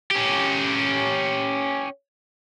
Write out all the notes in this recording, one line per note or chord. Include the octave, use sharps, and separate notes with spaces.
C#4 G4